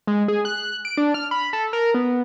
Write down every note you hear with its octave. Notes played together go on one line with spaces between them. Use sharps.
G#3
G#4
F#6
D7
D4
F6
B5
A4
A#4
B3